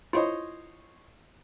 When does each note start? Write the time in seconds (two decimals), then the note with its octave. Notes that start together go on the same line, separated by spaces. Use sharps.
0.13 E4 F4 C5 C#5 D#5